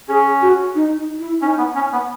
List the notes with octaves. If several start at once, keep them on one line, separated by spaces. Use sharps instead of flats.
C#4 G#4
F#4
D#4
D#4
E4
C#4 D#4
B3
C#4
B3